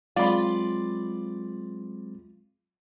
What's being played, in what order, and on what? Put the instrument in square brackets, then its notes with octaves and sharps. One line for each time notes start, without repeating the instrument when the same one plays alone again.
[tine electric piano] F#3 G#3 C4 [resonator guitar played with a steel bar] F4 [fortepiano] D5 B5